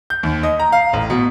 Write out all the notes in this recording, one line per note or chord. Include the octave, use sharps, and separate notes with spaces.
G6
D#2
D#5
A#5
F5
A1
B2